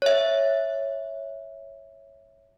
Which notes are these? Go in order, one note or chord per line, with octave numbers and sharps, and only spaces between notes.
C#5 E5